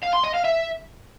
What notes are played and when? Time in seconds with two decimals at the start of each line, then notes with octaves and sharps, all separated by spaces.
0.03 F5
0.13 C6
0.23 D#5
0.34 F5
0.44 E5